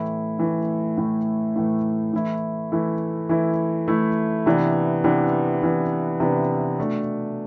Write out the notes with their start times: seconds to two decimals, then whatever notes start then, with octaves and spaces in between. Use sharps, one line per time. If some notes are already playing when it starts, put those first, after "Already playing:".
Already playing: A2 E3 A3 E4
0.39 A2 E3 A3 E4
0.97 A2 E3 A3 E4
1.55 A2 E3 A3 E4
2.13 E3 A3 E4
2.72 E3 A3 E4
3.29 E3 A3 E4
3.88 E3 A3 E4
4.46 C3 E3 B3 D4
5.04 C3 E3 B3 D4
5.62 C3 E3 B3 D4
6.20 C3 E3 B3 D4
6.79 B2 A3 D4